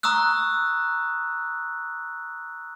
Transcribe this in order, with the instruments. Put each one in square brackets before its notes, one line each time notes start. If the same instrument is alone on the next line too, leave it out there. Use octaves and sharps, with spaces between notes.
[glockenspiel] A#5 C#6 D#6 E6 F#6